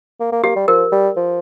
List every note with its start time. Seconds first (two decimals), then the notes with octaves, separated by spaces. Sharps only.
0.20 A#3
0.32 A#3
0.44 A#3 G4
0.56 G3
0.68 F3 A#4
0.92 G3
1.16 F3